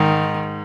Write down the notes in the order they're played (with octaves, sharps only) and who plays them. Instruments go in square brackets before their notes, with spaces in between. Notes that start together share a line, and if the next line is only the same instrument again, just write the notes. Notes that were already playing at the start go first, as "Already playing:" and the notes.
Already playing: [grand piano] G#2 [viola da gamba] D#3